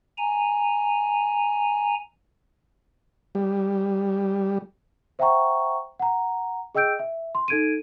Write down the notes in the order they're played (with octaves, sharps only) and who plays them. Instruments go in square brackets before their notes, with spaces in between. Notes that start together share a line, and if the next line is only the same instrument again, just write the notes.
[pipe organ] G#5 A#5
[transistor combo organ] G3
[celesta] C5 E5 F#5 G5 A#5 C#6
F#5 A#5
G#4 D#5 G5 E6 G6 D7
E5
C6
D#4 A4 G#6 D7 D#7